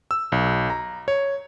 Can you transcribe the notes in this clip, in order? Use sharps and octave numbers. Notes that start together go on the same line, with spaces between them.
E6
B1
A#5
C#5